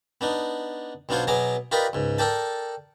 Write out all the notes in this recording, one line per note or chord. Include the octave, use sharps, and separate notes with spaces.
B3 D4 D#4
B1 B3 D4 F4 C5 C#5
B2 F#3 B3 G#4 A#5 D6
F4 G4 A#4 B4 D5 D#5
C#2 G#2
A4 A#4 D5 G5 A5